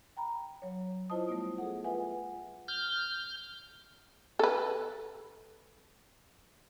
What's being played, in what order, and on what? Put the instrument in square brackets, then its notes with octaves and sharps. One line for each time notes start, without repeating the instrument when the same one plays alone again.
[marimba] G5 A#5 B5
F#3 C#5
E4 F4 C5 D#5 A5 D#6
G3 A3 B3
G#4 A4 F#5
F4 B4 E5 F#5 G#5
[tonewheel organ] F6 G6
[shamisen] A4 B4